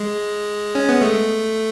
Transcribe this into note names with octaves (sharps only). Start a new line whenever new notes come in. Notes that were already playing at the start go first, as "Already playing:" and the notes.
Already playing: G#3
C#4
B3
A3